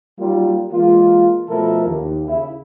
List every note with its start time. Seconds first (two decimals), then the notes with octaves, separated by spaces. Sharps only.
0.17 F#3 G3 A#3 D#4 F4
0.71 E3 G#3 A#3 F4
1.47 B2 F3 A3 E4 A4 A#4
1.85 D#2
2.27 C#3 E4